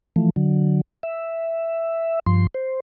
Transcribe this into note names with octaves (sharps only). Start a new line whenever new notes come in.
E3 F3 A3
D3 F#3
E5
G2 F3 C6
C5